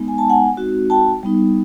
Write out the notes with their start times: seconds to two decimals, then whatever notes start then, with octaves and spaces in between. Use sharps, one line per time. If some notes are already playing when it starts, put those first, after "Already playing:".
Already playing: G#3 B3 D#4
0.08 G#5
0.18 A5
0.29 F#5 G#5
0.57 G#3 C4 D#4 F#4
0.90 G5 A5
1.23 G3 B3 D#4